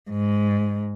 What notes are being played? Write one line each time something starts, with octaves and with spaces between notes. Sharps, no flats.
G#2